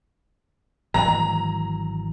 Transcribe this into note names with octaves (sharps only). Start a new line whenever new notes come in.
G#1 E3 F#3 A#5